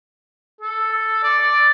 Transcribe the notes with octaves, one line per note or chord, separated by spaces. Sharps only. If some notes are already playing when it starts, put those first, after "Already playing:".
A4
D5
D5